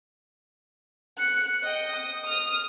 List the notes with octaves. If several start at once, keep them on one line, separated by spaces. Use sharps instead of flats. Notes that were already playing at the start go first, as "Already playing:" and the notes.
F#6 C#7
D#5 G5
D#6
D#6 F6